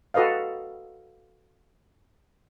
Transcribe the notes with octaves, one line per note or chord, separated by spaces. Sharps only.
F#4 A4 B4 D#5 F5